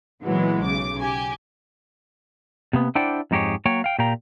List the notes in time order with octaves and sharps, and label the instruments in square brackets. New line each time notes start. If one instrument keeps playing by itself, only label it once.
[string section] A#2 E3 F#3 G#3 B3
B1 C#3 D6
G4 G#5
[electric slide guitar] C3 A#3 B3
D4 E4 C5 D5 F#5 G5
F2 G#2 D#4 G4 G#4 C#5
F#3 A#3 C#5 G5
F5 G5
A#2 G4 F5 G5 A#5